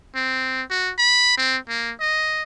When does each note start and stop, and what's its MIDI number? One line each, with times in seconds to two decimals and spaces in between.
0.15 0.63 60
0.70 0.92 66
0.98 1.34 83
1.38 1.57 60
1.69 1.92 58
2.00 2.43 75